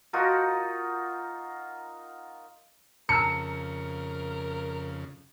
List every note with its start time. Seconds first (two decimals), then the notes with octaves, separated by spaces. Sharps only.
0.13 D#4 F4 F#4 A#4
3.09 F2 C#3 A#4 A5 A#5 E6 C#7